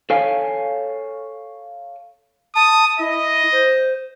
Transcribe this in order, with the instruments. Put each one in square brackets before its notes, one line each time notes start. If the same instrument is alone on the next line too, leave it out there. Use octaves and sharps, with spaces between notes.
[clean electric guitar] A4 C#5 F5 G#5
[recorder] A5 [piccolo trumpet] D#6
[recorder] E4 [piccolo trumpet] D#5
[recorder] C5